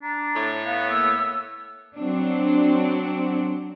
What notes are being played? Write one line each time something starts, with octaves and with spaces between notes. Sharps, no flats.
D4 A#5
A2 A3 C#5
B3 F5
A#3 E6
F#3 C4 D4